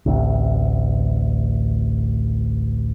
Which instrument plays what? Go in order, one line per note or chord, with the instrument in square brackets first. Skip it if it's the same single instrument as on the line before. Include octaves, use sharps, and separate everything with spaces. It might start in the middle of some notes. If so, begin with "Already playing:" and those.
[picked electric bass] A1 D2 C3